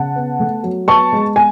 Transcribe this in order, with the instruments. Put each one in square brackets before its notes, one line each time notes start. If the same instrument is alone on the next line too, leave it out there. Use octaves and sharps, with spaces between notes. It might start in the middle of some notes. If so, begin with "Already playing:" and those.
Already playing: [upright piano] C#3 F#5 A5
B3
A3
F#3
B3 A5 C#6
G#3
G#5